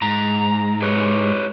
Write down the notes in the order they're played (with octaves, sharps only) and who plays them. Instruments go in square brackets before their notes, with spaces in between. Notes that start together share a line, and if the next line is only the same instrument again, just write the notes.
[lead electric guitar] G#2 [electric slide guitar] A#5
[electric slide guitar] G4 B4 C#5